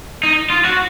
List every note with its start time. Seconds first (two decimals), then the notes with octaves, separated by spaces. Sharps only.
0.23 D#4
0.50 F4
0.65 F#4